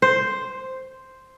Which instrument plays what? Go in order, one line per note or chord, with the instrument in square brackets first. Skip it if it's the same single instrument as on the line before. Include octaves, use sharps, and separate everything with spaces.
[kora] C5